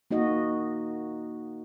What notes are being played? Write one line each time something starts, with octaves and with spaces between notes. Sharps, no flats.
A#3 D#4 F#4 D#5